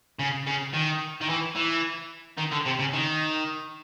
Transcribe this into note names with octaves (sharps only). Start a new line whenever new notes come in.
C#3
C#3
D#3
D#3
E3
E3
D#3
D3
C3
C#3
D#3